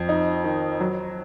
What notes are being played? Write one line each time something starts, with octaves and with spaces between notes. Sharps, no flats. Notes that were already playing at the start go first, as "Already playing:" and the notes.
Already playing: F2
D#4
D#3
F#3